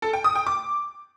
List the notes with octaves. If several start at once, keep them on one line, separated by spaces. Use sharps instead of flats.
A4
G5
D#6
G5
D6